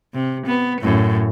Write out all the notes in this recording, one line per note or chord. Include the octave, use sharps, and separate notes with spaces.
C3
B3
F#2 A2